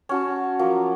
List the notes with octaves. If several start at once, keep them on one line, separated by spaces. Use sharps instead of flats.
C#4 F#4 A5
F3 F#3 A#3